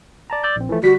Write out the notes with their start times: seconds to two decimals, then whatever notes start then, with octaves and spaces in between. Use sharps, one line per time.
0.30 D5 A5 A#5
0.43 D5 E6 G6
0.56 A#1 C4
0.69 E3 F3 A3
0.83 D3 G3 F#4 B6